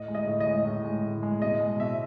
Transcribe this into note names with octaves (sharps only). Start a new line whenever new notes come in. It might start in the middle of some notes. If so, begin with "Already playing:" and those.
Already playing: A2 D#5
G#3
D#5
A2
D#5
G#3
A2
G#3
A2
G#3
B2 D#5
G#3
B2 E5